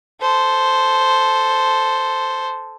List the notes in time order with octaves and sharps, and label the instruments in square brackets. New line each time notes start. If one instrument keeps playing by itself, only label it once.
[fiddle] A4 C5